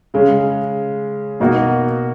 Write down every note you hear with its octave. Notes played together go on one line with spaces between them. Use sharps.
C#3 G#3 C#4
B2 A#3 D#4 F#4